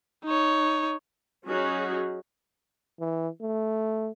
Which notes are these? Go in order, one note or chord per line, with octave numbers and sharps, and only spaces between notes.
D#4 C#5
F#3 C#4 D#4 F#4 G#4
E3
A3